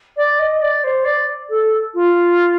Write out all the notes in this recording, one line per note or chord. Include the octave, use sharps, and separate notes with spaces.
D5
D#5
D5
C5
D5
A4
F4